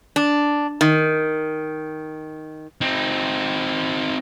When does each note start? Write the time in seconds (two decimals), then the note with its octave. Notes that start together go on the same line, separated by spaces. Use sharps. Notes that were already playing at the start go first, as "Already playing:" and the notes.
0.16 D4
0.81 D#3
2.81 C4 D#4